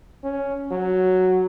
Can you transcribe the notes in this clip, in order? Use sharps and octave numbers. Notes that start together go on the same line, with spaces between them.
C#4
F#3